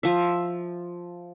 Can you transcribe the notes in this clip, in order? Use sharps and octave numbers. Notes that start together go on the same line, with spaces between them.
F3 E5